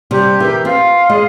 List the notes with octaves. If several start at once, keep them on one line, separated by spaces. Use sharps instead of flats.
C3 G3 G4
E3 A#4
C4 F4 F5
G#3 D#5